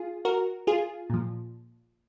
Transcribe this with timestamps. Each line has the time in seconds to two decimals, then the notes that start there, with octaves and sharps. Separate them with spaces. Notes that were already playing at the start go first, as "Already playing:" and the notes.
Already playing: F4 G#4
0.25 F#4 A#4
0.67 F4 G#4
1.10 A#2 F3